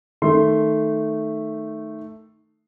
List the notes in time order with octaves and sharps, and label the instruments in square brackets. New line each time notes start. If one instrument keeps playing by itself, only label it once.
[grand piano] D#3 A3 C6